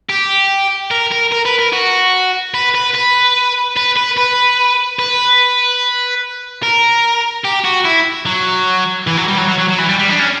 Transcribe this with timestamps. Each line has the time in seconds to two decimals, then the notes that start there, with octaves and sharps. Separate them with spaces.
0.09 G4
0.91 A#4
1.12 A#4
1.32 A#4
1.46 B4
1.59 A#4
1.73 F#4
2.54 B4
2.75 B4
2.95 B4
3.77 B4
3.97 B4
4.18 B4
4.99 B4
6.62 A#4
7.44 G4
7.64 F#4
7.85 E4
8.26 F#3
9.07 E3
9.17 F#3
9.28 G3
9.38 F#3
9.48 F#3
9.58 F#3
9.69 F#3
9.78 E3
9.89 G3
9.99 G3
10.09 D4
10.19 C#4